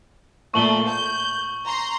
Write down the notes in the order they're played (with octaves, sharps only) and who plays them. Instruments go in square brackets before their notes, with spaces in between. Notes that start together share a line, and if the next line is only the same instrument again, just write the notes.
[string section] A#2 A3 [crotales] C#6 F#7 G7
[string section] G6
A#5 C6